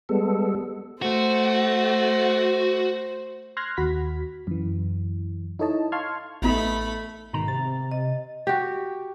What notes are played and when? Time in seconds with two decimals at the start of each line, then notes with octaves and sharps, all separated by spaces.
0.09 G3 G#3 B3 A4
1.02 A3 F#4 C5
3.57 C6 F6 F#6 G#6 A#6
3.77 D#2 F#4 B5 B6
4.47 F#2 E3
5.59 D#4 E4 A4 C#5 D#5 A5
5.92 F5 A5 C6 C#6 F6 G#6
6.42 A1 A3 B3 D#4 B5
7.33 G#2 B2 D#3 A#5
7.48 C3 A6
7.92 D#5
8.47 F#4 G4